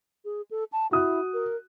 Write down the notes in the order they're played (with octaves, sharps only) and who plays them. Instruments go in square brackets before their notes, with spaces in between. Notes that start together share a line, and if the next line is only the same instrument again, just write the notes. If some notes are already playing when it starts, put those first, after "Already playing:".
[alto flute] G#4
A4
A5
[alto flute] E4 [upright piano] F#4 D#6 F#6
[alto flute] A#4